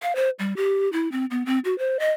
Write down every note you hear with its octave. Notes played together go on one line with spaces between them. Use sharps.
F5
C5
G3
G4
E4
C4
B3
C4
F#4
C5
D#5